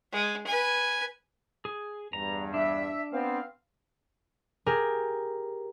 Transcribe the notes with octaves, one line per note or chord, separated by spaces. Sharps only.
G#3
B4 G#5
G#4
E2 G2 A#5
D4 E5
B3 C4 F5
G4 G#4 A#4